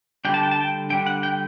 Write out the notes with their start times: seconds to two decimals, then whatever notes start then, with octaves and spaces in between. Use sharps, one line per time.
0.25 D3 G3 D4 G5
0.34 A5
0.43 G5
0.51 A5
0.60 G5
0.90 D3 G3 D4 G5
1.07 F#5
1.23 G5